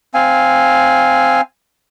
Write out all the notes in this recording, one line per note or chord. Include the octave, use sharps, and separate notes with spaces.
C4 F5 G#5